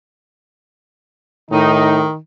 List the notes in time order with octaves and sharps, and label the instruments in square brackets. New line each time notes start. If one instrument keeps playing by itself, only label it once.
[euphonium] A2 [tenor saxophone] D#3 [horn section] D#4